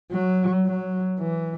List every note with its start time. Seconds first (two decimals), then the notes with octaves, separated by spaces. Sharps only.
0.12 F#3
0.66 F#3
1.20 E3